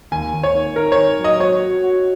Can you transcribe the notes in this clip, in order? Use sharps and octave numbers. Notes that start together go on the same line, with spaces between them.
D#2 G#5
D#2
C#5
D#3
D#3 A#4
C#5
D#3
F#3
D#5
F#4 C#5
F#4
F#4